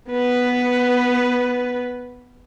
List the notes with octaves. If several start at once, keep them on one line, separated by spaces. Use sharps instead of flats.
B3 B4